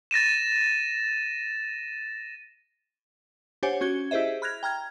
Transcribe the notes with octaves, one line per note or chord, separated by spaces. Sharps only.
A6 A#6 D#7 E7
D4 G4 C5 C#5 F#5 G#5
C#4 F#4 G#6 G7
E4 G4 G#4 C5 D#5 E5
B5 F6 F#6 G#6 A#6 F7
G5 A#5 F6 G#6